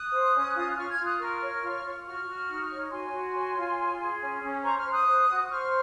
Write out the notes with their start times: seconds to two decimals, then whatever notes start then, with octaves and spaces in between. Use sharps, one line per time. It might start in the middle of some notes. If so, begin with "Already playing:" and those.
Already playing: D#6 F#6
0.11 C5
0.33 C#4
0.55 F4
0.70 F#6
0.76 F4 C#6 F6
0.91 F6 G#6
0.98 F4
1.04 D#6 F#6
1.19 A#4 C#6 F6
1.41 C#5
1.62 F4
1.84 F4
2.05 F#4 C#6 F6
2.27 F#4
2.48 D#4
2.70 C#5
2.79 C#6
2.91 F#4 G#5 C6
3.12 F#4
3.34 C#5
3.56 F4
3.77 G#4
3.99 G#4
4.20 C#4
4.42 C#4
4.63 C5 A#5 C#6
4.78 C#6 F6
4.85 C5
4.92 D#6 F#6
5.06 C5
5.28 F#4
5.49 C5 C#6 F6